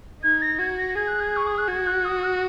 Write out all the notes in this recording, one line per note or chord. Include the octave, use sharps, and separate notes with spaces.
D#4 G#6
A#6
F#4 G#6
A#6
G#4 G#6
F#6
G#6
C#6
D#6
F#6
F#4 G#6
F#6
D#6
F#6